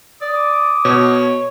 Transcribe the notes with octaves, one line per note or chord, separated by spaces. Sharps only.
D5 D6 D#6
B2 C#5